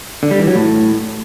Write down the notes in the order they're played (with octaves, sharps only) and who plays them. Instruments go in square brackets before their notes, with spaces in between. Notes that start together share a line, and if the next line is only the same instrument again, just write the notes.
[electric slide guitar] D3
G3
E3
F#3
A2